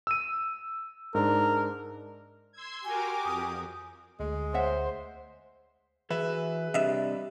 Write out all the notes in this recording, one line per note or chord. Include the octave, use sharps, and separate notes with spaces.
E6 D#7
G#2 D4 A#4
C6 E6 G#6
F#4 G4 A#4 G#5 D6
F2 D#6
D2 G#3
C5 C#5 E5 F#5
E3 F#4 G#4 B4 E5
C3 G3 D4 D#5 E5